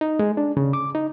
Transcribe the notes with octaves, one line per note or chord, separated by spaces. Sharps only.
D#4
G#3
D4
C#3
D6
D#4